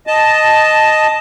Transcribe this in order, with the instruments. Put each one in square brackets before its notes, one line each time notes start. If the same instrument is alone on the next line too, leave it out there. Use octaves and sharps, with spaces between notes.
[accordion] D#5 A5